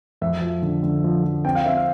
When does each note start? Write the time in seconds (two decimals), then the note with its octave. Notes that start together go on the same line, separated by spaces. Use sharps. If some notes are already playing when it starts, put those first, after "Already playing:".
0.21 F2 E5
0.42 F3
0.62 D3
0.83 D3
1.04 F3
1.24 F3
1.45 C4 G5
1.55 F5
1.65 C4 E5
1.77 F5